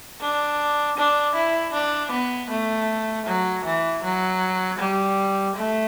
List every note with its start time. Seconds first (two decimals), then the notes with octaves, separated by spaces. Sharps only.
0.21 D4
0.97 D4
1.35 E4
1.74 D4
2.11 B3
2.50 A3
3.26 F#3
3.64 E3
4.03 F#3
4.78 G3
5.55 A3